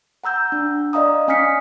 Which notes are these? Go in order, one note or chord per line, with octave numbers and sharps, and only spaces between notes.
F#5 A#5 E6 G6
D4
D5 D#5 F5 A#5 D#6
C#4 G#5 D#6 F6 B6 C#7